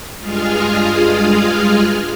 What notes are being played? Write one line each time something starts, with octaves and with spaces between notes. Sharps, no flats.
G2 G#3 F4 G#4 F5